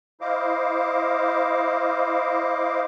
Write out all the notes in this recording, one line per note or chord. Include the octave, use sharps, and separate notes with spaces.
E4 C5 D#5 F5 D6